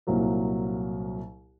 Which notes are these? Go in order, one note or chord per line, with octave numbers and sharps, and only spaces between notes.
C2 A#2 F#3 A#3